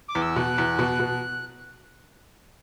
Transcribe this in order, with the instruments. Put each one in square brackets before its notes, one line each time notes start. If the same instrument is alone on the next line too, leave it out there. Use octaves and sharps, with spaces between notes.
[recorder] D6
[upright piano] E2
[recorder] E6
[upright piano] B2 [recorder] F#6
[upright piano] E2
B2
B2